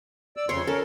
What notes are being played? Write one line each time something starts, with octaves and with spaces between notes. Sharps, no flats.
D5 E6
F2 C#3 C#5 C6
C#4 A4 A#4